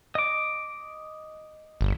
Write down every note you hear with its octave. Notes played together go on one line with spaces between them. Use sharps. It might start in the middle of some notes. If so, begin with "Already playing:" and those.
D#5 D6
G1